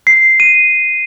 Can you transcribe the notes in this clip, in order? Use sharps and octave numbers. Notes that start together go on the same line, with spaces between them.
C7
D#7